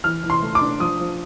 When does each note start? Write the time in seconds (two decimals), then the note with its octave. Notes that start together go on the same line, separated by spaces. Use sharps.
0.04 E3 F6
0.24 E3
0.30 C6
0.42 A3
0.55 D6
0.61 D4
0.80 F3 D#6
1.00 F3